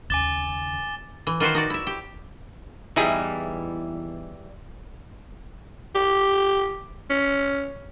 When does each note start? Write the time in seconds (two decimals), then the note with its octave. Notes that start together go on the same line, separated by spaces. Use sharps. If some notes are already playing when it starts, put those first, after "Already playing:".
0.10 D#2 C#3 G#5 D6 A6 E7 G7
1.27 E3
1.40 D#3 F4 F#4 B4 C5
1.55 D#4 F#4 D5
1.70 E4 E5
1.87 G4
2.96 E2 E3 G3 D#4 E4 G#4
5.95 G4
7.10 C#4